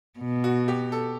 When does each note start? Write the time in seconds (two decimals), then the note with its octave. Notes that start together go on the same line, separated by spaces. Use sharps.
0.20 B2
0.44 F#4
0.68 G4
0.92 A4